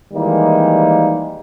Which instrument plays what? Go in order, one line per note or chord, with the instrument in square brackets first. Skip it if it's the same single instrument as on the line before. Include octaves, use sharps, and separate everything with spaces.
[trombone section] D#3 E3 G3 G#3 A#3 D#4